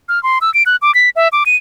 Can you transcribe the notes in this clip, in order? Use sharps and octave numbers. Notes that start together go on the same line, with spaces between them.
F6
C6
E6
D7
F#6
D6
B6
E5
D6
D#7